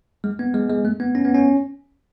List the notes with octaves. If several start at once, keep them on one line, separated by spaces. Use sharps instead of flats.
G#3
B3
G#3
G#3
A3
B3
C#4
B3
C#4